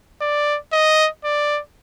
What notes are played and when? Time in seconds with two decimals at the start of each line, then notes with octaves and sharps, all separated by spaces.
0.21 D5
0.73 D#5
1.24 D5